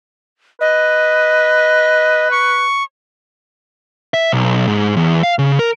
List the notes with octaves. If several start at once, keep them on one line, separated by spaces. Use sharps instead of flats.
B4 D#5
C#6
E5
B1
G#2
E2
F5
C#3
A#4